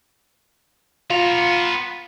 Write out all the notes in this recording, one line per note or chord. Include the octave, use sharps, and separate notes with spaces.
B3 F4 A#5